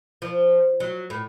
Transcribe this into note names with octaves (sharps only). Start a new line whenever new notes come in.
F3
F#3
A2